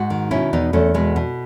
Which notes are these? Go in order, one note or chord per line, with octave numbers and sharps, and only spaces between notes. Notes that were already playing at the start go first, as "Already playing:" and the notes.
Already playing: G#2 D#4 F#4
D#3
B2 C#4 E4
E2 B3 D#4
E2 A3 C#4
B2 G#3 B3
B2